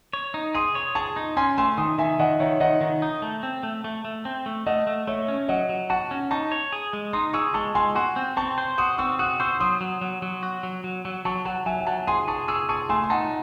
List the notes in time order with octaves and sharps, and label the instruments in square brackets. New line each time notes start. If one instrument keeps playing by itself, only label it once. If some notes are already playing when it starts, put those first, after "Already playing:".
[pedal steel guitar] C#5
D#4
[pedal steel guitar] G#4 [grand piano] C6 D#6
[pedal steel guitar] C#5
[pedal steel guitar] G#4 [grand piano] A5 C#6
[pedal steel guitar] D#4
[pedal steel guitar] C#4 [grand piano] G#5 C6
[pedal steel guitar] A3 [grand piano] G#5 C6
[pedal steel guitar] D#3 [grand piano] C6 D#6
[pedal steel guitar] D#3 [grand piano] E5 G#5
[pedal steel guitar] D#3 [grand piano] D#5 F#5
[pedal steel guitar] D#3 [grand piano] C#5 E5
[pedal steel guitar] D#3 [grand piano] D#5 F#5
[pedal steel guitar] D#3
D#4
A3
C4
A3
A3
A3
C4
A3
[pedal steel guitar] A3 [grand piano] D#5 F#5
[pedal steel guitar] A3
[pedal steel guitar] A3 [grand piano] C#5 E5
[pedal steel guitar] C#4
[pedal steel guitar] F#3 [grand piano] D#5 F#5
[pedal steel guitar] F#3
[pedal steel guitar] F#4 [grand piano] F#5 A5
[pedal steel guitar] C#4
[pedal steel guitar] D#4 [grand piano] A5 C#6
[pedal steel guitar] C#5
G#4
G#3
[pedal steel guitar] D#4 [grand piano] C6 D#6
[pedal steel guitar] G#4 [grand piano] C#6 E6
[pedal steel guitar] G#3 [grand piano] A5 C#6
[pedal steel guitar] G#3 [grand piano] G#5 C6
[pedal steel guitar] F#4 [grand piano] G#5 C6
[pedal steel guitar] C4
[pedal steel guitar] C4 [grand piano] A5 C#6
[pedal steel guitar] C5
[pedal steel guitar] F#4 [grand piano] C6 D#6
[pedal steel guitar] C4 [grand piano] C#6 E6
[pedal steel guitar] F#4 [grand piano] D#6 F#6
[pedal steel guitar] C5 [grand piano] C#6 E6
[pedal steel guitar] F#3 [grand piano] C6 D#6
[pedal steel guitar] F#3
F#3
F#3
F#4
F#3
F#3
F#3
[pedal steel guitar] F#3 [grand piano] A5 C#6
[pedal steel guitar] F#3 [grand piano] F#5 A5
[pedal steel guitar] F#3 [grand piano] E5 G#5
[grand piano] G#5
[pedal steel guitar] F#3 [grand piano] F#5 A5
[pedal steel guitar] G#4 [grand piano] G#5 C6
[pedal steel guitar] G#4 [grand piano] A5 C#6
[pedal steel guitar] G#4 [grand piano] C#6 E6
[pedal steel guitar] G#4 [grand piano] A5 C#6
[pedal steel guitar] A3 [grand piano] G#5 C6
[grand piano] C6
[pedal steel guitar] D#4 [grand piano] F#5 A5